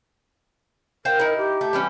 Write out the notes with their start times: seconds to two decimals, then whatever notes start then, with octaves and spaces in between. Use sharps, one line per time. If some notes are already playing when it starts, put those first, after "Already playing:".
1.05 A#4 C5 F5 G5
1.19 D#4 E4
1.37 G4
1.61 A3
1.73 E3 G3 C#4